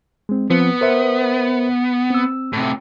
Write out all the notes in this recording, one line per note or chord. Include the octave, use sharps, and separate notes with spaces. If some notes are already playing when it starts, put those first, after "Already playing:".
G#3 C4
F3 B3 C4
A#4 C5 E5
C4 E6
A2 C3